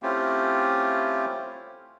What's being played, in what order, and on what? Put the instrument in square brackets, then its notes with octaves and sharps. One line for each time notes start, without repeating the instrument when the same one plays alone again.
[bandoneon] A3 C4 C#4 E4 F4 G4